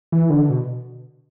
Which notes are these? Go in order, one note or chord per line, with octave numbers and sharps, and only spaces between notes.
E3
D3
B2